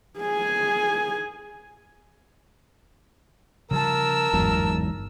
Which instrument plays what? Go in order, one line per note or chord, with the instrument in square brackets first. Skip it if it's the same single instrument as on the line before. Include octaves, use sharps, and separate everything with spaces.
[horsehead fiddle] G#4 G#5
[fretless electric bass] C#3 F3 G3 [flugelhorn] A#4 [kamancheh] A5 E6
[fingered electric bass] G1 E2 G#2 [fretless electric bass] F#3